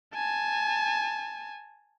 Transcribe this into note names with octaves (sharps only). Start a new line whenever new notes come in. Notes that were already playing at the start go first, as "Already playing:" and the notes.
G#5 A5